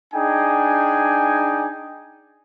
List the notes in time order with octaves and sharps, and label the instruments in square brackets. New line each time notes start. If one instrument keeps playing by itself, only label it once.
[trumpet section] D4 D#4 G#4 G5 G#5